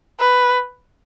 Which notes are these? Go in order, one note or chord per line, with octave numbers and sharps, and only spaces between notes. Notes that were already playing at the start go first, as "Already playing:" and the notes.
B4